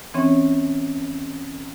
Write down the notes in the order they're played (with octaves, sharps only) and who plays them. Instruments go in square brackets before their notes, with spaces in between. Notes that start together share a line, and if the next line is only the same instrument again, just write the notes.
[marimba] E3 C4 C#4 C#5